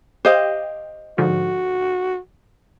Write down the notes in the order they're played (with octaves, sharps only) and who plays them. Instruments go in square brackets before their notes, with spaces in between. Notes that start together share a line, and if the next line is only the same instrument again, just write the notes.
[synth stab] G4 F5 G5 [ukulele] C5 D#5
[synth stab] G#2 D3 F3 [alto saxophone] F#4